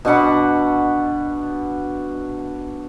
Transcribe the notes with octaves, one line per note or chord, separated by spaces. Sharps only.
B2 D4 F#5 B5